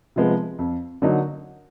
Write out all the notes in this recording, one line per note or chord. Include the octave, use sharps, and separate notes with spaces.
C3 F3 G#3 B3
F2
D3 F#3 A#3 D#4